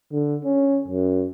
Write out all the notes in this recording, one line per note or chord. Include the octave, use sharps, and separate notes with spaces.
D3
C#4
F#2